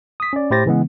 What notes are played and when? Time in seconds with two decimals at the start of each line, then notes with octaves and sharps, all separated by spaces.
0.20 D#6 B6
0.33 C#4 D5
0.51 A2 E4 G4 C5 A6 A#6
0.66 C#3 E3 G#3 B3